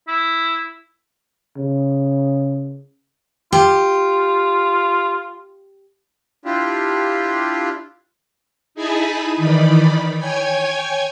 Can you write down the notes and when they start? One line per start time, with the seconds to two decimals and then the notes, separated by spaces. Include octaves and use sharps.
0.08 E4
1.57 C#3
3.52 F4 G4
6.45 D4 E4 F4 G4
8.75 D#4 E4 G#4 G#5 A5 B5
9.37 D#3 E3 D#4 D5 B5
10.18 C#5 G5 G#5 G#6